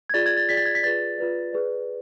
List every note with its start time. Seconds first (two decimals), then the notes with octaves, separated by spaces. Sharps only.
0.10 G#6
0.14 F4 G#4 D5 A6
0.26 G#6
0.37 A6
0.49 F4 G#4 D5 B6
0.57 A6
0.66 G#6
0.75 B6
0.83 F4 G#4 B4 D5 A6
1.18 F4 G#4 B4 D5
1.53 G#4 B4 D5